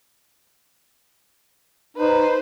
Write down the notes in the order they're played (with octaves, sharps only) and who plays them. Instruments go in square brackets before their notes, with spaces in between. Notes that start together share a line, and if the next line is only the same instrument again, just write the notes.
[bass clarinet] D#4 [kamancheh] B4 C5